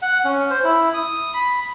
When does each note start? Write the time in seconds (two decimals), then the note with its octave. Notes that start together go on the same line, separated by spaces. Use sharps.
0.02 F#5
0.25 C#4
0.51 C5
0.64 E4
0.94 D#6
1.34 B5